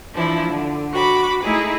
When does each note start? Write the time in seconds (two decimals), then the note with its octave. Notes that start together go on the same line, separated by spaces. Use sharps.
0.13 E3 F3 D4 E4
0.47 D3
0.92 F#4 B5 D6
1.44 A3 D#4 E4 G#4